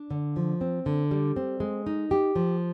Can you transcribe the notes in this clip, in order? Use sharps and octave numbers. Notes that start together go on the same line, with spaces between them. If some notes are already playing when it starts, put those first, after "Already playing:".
Already playing: D4
D3
F3
C4
D3
G3
C4
G#3
D#4
G4
F3